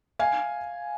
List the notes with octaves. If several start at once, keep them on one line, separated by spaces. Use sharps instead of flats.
F5 G#5